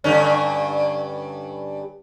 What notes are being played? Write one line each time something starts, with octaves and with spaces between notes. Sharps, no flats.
G2 D3 C#4